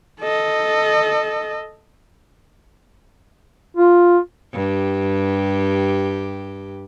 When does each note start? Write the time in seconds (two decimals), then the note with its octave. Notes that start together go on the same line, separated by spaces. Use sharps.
0.21 A4 D#5
3.77 F4
4.53 G2 G4